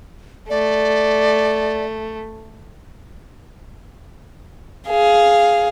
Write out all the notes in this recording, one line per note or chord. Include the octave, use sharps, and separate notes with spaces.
A3 D5
G#4 F5